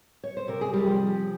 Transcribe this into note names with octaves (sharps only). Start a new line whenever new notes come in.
C#5
C5
C3 A#4
G#4
G3 G4
F3